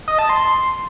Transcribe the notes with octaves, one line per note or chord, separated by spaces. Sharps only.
D#5
A5
C6